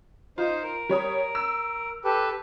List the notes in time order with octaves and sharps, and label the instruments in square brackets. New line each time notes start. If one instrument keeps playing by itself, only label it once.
[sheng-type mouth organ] D#4 C5 [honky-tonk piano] F4
[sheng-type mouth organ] A#4
[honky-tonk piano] G3 C#5 D#6
E6
[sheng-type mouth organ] G4 A4 B4